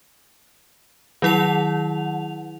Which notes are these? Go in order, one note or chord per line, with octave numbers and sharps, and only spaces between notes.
D#3 F#3 E4 F#5 F7